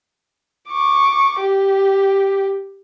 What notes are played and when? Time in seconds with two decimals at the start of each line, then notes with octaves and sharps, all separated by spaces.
0.70 C#6 D6
1.41 G4